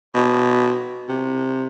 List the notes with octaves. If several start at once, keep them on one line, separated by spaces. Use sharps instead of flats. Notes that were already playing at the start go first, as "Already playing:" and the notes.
B2
C3